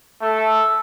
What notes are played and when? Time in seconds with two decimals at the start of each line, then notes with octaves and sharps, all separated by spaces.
0.21 A3 A4